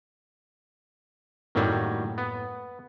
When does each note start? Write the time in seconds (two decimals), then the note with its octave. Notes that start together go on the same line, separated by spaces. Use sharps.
1.55 F#2 A2 D#3 F#3 G3 A#3
2.18 B3